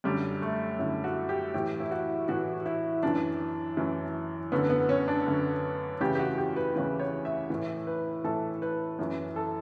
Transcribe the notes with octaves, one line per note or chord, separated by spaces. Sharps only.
F#2 D3 G3
A3
F#2 D3 E4
F#4
G4
A2 E3 G4
E4
F#4
A2 E3 F#4
E4
F#2 E3 D4
F#2 E3
F#2 D3 B3
B3
C#4
D4
F#2 D3
E2 C#3 E3 G4
G4
F#4
G4
B4
E2 C#3 E3 B4
C#5
E5
A2 E3
B4
A2 E3 A4
B4
F#2 E3
A4